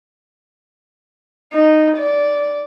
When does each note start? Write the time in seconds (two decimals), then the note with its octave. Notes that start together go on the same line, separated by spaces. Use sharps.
1.53 D#4
1.97 D5